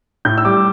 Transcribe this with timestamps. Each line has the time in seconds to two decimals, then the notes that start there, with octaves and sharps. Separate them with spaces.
0.25 A2 G6
0.38 E6
0.45 G3 D6